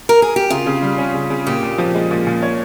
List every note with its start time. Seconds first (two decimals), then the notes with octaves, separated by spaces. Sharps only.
0.09 A#4
0.22 G#4
0.36 G4
0.50 C#3 F4
0.66 C#3
0.82 G3
0.98 C#4
1.14 C#3
1.30 C#3
1.47 A#2 G4
1.63 A#2
1.78 F3
1.95 G#3
2.11 A#2
2.27 A#2
2.43 C#5